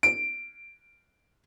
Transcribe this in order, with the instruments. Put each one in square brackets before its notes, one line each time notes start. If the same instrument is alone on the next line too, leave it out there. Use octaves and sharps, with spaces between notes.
[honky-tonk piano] D7